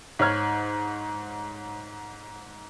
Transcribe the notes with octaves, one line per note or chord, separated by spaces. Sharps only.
G#2 C#5 F6 G#6